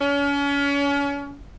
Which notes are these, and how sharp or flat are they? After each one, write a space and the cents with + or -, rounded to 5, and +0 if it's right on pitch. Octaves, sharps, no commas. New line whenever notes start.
C#4 +35